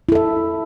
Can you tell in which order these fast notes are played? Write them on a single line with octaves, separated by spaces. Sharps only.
E4 A4 E5